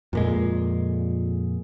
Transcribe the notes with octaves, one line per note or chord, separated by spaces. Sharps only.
F2 A#2 G#3